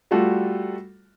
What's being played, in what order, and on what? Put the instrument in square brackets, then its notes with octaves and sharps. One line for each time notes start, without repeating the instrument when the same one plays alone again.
[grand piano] G3 A3 F4 F#4 A4